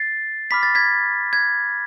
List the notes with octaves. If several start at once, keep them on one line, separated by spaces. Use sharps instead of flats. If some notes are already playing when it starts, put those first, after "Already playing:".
Already playing: A6 C7
B5 D6 F6 B6
A6
G#6 B6
G#6